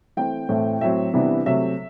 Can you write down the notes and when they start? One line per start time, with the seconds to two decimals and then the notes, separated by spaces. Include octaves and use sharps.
0.17 E3 A3 C4 G5
0.49 A2 E3 A3 C4
0.81 A2 F#3 C4 E5
1.14 C3 E3 G3 B3 D4
1.46 C3 F#3 A3 E5